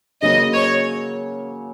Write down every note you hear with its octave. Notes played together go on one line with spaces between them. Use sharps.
C#3 F#3 A#3 C#4 D#5
C#5